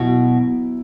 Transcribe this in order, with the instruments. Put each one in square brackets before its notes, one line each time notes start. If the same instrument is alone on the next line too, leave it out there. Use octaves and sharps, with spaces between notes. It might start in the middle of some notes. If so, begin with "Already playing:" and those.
Already playing: [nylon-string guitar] B2 [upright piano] F#3 E4